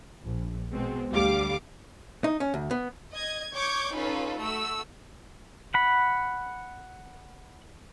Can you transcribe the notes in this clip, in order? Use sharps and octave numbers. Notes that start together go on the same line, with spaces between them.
A#1
B2 G#3 C4
D2 G3 F5 D6
D#4
C#4
D2
B3
D#5 G#6
C#5 C#6 D6 G6 G#6
C#4 D#4 F4 A4 B4
A3 F#4 E6
F#5 B5